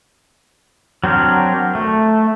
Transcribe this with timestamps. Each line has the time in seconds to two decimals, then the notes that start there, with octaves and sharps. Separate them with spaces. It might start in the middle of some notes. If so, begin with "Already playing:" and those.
1.04 F#3 C4 D4 A#4
1.75 A3